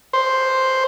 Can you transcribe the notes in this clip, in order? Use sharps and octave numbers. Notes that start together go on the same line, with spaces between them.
C5